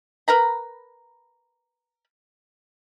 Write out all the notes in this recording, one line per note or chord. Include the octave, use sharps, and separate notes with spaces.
A#4 B4 A#5 B5